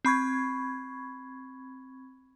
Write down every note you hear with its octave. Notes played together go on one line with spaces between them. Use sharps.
C4 B5 C#6 G#6